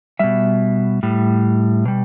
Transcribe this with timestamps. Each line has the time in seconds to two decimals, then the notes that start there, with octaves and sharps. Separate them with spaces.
0.19 B2 G3 E5
1.03 A2 G3
1.85 B2 G3